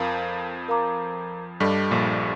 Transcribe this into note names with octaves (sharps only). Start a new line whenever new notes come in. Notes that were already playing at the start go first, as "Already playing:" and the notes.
Already playing: F2 F3 A#4 F5 A#5 D6
A#4 F5 A#5 D6
G2 G3 A4 D#5 A5 D6
A#1 A#2